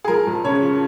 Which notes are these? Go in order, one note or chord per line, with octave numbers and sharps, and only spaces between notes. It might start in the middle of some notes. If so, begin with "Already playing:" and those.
G#4
F3 A#4
F2
C#3 C#5
F3